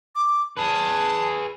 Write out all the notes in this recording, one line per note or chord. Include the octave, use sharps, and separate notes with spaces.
D6
G#4 B4 A5